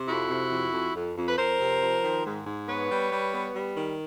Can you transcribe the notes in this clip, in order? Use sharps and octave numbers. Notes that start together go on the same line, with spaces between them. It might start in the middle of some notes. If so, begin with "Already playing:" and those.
Already playing: C3
F2 E4 F#4
C3
F2
F2
F2
F2
B4
F2 A#4 C5
C3
F3
D#3
G#2
G#2
B3 B4 C#5
G3
G3
B3
G3
D#3